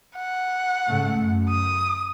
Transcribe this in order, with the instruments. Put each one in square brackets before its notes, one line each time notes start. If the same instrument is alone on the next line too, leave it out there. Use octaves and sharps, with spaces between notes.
[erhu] F#5
[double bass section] G#2 C#3 A3
F#2
[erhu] D#6